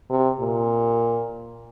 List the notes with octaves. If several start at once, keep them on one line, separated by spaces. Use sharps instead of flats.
C3
A#2